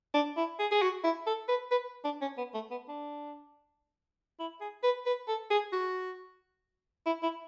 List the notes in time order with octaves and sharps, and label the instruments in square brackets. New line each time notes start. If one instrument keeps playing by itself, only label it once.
[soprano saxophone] D4
E4
G#4
G#4
F#4
E4
A4
B4
B4
D4
C#4
B3
A3
B3
D4
E4
G#4
B4
B4
A4
G#4
F#4
E4
E4